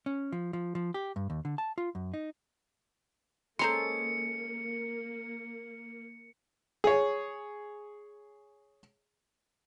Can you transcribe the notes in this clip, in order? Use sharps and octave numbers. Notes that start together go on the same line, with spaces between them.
C#4
F3
F3
F3
G4
G2
D#2
D3
A5
F4
F#2
D#4
G#3 A#3 C#4 A4 C5 A#5 C6 C#7
G#4 C#5